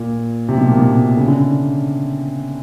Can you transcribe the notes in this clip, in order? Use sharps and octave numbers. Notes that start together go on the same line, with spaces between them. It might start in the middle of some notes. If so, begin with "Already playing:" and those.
Already playing: A#2
C3
B2
A#2
B2
C#3
D3